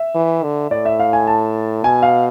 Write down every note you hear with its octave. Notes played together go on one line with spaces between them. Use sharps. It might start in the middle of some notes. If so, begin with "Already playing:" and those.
Already playing: E5
E3
D3
A2 D5
E5
F5
G#5
A5
B2 G#5
F5